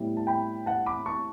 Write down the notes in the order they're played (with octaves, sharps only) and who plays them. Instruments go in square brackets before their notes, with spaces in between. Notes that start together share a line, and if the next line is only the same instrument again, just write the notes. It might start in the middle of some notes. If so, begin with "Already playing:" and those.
Already playing: [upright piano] A2 G3 B3 E4
A5
G5 B5
F#5 A5
B5 D6
A5 C#6